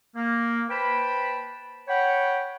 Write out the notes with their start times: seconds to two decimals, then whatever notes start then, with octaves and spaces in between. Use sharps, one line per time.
0.15 A#3
0.70 B4 C5 G5 A5 B5
1.88 C#5 F#5 G5 B5